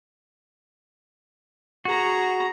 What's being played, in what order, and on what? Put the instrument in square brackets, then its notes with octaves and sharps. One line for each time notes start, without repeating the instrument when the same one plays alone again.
[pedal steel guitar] F#4 [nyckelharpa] G#4 A#5